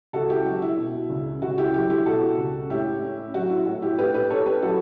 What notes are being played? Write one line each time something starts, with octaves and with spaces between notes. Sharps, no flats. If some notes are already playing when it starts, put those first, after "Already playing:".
C#2 F#4 A4
E4 G4
F#3 F#4
E4
B2
C#2
C#2 F#4
E4 G4
F#3 E4 G4
E4 G4
B2 F#4 A4
C#2
A2 E4 G4
C#4
F#3 F#4
E4
A2 F#4
E4 G4
A2 G4 B4
G4 B4
C#4 A4 C#5
G4 B4
F#3 F#4 A4